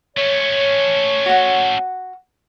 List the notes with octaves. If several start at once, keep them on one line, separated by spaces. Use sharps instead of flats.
A3 C#4 C#5
F#4 F#5